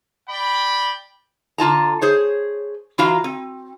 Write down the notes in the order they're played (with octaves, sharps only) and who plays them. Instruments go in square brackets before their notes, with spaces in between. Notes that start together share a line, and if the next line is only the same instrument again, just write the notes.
[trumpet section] D5 G5 B5
[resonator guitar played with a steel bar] D3 F4 A5 A#5
G#4 C5 C#5
E3 F4 F#4 F5 A#5
C4